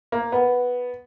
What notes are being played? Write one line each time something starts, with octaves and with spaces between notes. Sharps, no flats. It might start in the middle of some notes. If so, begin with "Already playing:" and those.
A#3
B3